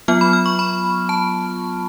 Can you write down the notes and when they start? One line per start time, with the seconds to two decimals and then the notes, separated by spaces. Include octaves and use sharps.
0.08 F#3 B3 F4 F6
0.21 B5
0.33 F6
0.46 C#6
0.59 B5
1.09 A5